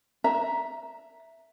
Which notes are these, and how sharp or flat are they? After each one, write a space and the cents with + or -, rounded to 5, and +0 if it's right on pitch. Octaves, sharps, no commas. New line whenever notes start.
E5 +0 A#5 +15